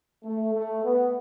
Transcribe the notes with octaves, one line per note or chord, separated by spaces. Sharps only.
A3
A3
B3